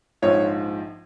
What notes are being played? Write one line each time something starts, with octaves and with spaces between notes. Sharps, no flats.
A#1 G#2 F3 C#5